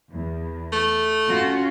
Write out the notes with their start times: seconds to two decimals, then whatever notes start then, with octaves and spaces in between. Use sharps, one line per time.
0.12 E2
0.72 A3
1.30 C#4 F4 F#4